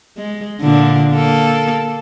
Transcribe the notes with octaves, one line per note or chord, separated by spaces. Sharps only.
G#3
A#2 D3
A#3 A4